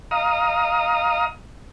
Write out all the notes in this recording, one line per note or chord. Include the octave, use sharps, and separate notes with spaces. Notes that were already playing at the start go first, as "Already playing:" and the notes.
D#5 F5 A#5 D#6